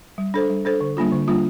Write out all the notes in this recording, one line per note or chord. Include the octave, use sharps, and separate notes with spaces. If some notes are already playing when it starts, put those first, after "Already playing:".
G3
D4 A4 C5
G3
D4 A4 C5
D3
G3 A#3 D4 F4
D3
G3 A#3 D4 F4